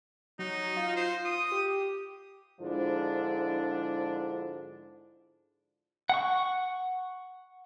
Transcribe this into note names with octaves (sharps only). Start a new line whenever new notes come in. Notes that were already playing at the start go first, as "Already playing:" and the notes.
F#3 D#4
F4
C5
D#6
G4
G#2 D3 F3 D4 E4
F#5 C#6